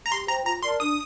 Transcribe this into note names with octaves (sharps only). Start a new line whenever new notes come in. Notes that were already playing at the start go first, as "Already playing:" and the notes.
A#5
G4 C6
C5 G5 A#5
F4 A#5
A#4 D5 A5 C6
D4 D#6